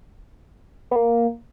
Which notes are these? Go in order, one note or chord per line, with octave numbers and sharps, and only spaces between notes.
B3
A#3